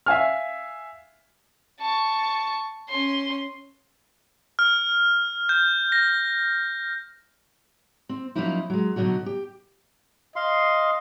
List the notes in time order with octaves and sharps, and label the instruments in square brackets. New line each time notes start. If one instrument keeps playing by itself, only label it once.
[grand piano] E5 F5 G#5 F6
[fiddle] A5 C#6
C#4 C6
[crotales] F6
G6
A#6
[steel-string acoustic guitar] C4
F3 F#3 A#3 C#4 D#4 E4
F#3 G#3
B2 D3 F#3 D#4 F#4
G4
[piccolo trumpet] D#5 [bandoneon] F5 C6